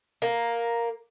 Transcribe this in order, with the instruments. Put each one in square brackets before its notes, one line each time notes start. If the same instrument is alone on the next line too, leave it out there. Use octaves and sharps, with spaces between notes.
[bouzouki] A#3